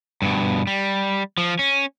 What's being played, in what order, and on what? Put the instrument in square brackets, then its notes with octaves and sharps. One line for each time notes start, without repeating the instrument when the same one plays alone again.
[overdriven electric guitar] G2 B2
G3
F3
C#4